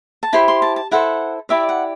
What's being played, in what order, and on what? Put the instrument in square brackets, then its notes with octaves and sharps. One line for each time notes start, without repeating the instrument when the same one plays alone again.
[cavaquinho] A5
E4 G4 C5 B5
C6
A5
A5
E4 A4 C5 F#5
E4 G4 D5 E5
F#5